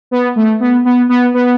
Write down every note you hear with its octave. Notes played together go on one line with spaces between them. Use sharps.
B3
A3
B3
B3
B3
B3